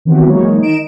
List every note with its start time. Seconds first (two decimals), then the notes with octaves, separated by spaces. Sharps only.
0.05 D#3 E3 B3 C4 F#4 G4
0.25 E3 F#3 G#3 A#3 D#4 C#5
0.61 D#3 D#4 D#5 D7 E7